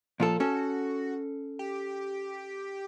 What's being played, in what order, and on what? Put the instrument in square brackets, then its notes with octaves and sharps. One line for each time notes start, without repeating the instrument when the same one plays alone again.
[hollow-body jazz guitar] A#2 F4 A4 [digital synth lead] F3
[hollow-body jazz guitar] C#4 A4 [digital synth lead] F#4
[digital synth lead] G4